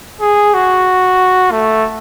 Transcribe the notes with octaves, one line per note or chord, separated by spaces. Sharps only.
G#4
F#4
A3